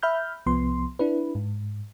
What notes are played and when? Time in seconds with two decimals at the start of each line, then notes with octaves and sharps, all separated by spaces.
0.03 E5 B5 F6 G6
0.46 C2 F3 B3 C6
0.99 D4 E4 B4
1.35 G#2